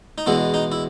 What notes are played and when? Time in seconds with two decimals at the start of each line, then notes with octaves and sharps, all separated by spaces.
0.18 D#4
0.26 E2 B2 G#3 B3 E4
0.54 D#4
0.72 E4